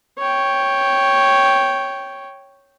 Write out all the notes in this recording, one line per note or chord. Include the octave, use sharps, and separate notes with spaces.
C#5 G5